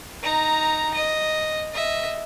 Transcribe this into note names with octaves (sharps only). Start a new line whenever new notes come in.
D#4 A#5
D#5
D#5 E5